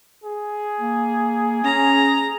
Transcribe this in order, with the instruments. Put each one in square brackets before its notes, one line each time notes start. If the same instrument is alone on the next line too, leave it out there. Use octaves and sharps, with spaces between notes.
[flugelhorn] G#4
[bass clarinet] A#3
[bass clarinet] C#4 [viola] A#5